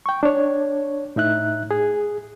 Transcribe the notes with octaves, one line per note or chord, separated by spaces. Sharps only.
G5 C#6
D4 C#5
A2 D#4 E5 F#6
G#4